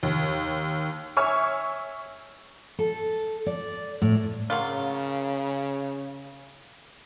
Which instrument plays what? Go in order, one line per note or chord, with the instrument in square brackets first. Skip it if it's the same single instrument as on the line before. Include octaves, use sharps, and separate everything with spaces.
[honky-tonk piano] D#2
C#5 E5 G#5 C#6 E6 F6
[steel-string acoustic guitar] A4
D5
A2
[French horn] C#3 [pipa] F#3 A#3 F4